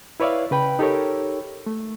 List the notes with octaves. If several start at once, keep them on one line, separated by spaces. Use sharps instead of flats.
E4 B4 C#5 D5 E5 F5
C#3 B4 G5 B5
D#4 G4 A4 A#4 C#5
A3